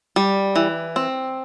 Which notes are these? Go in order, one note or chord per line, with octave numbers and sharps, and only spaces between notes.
G3
E3
C4